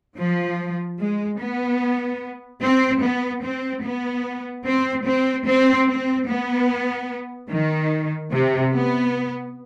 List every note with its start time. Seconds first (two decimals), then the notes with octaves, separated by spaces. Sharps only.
0.18 F3
0.99 G#3
1.40 B3
2.62 C4
3.03 B3
3.44 C4
3.84 B3
4.66 C4
5.06 C4
5.47 C4
5.88 C4
6.28 B3
7.51 D#3
8.32 C3
8.73 B3